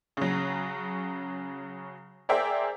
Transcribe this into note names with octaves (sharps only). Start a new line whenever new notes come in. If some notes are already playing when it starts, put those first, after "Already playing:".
C#3 F#3
G#4 A#4 C5 D5 E5 G5